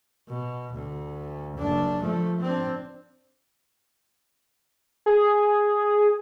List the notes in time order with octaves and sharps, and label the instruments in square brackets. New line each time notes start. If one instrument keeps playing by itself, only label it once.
[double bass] B2
D2
F#1 D4
F3 A3
C4 D4
[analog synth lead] G#4